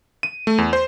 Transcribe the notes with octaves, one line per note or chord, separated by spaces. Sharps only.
D#7
A3
E2
C5